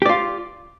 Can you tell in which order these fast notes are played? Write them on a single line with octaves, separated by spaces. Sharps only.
G4 D5 F4